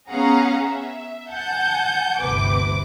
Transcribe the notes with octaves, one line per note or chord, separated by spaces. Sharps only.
B3 C#4 G#4 F5 F#5 A#5
E5
F#5 G#5 A5 G6
G1 D2 C3 B4 D6